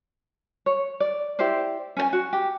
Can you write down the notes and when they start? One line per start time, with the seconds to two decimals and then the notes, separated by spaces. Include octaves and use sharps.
0.66 C#5
1.00 D5
1.39 E4 G4 C5 D5
1.97 C#4 B4 G#5
2.13 F#4
2.33 G4